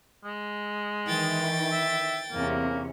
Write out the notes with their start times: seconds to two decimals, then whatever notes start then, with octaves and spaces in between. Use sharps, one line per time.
0.24 G#3
1.07 D#3 E3 G5 A6
1.72 E5
2.32 E2 C3 A#3 C#4